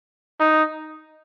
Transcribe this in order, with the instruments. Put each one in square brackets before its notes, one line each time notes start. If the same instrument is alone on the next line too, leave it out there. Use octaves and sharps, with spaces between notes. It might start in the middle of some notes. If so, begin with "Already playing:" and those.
[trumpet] D#4